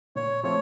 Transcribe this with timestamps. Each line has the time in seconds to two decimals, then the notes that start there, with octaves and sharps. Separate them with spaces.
0.16 A#2 C#5
0.43 F3 A3 C4 C#5